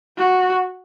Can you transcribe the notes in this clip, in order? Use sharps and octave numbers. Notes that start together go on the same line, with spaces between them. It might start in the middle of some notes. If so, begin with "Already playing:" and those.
F#4